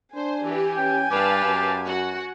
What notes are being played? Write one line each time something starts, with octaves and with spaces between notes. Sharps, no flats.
D4 C5 G#5
E3 G4
C#4 G5
G2 G4 B4 F5 A5
F#2
F#4 F#5